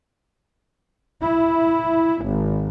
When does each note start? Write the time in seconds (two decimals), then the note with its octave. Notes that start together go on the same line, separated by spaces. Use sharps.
1.22 E4
2.23 G#1